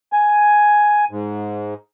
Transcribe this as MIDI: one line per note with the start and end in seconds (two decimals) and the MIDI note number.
0.12 1.05 80
1.11 1.74 44